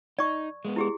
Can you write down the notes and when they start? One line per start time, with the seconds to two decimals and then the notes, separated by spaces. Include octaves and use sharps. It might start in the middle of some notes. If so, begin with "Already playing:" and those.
0.19 D#4 D5 C#6
0.65 G#3 A#3 B3
0.76 E4 G4 G#4